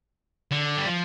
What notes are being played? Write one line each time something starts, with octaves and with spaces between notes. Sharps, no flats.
D3
G3
F3